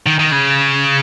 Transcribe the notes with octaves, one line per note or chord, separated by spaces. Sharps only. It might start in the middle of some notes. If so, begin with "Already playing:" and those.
D#3
D#3
C#3